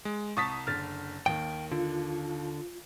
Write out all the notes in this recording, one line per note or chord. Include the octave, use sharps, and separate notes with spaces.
G#3
C2 A5 C#6 D#6 A6 B6
F#1 D3 F6 A6
D#2 D#3 G5
D3 F4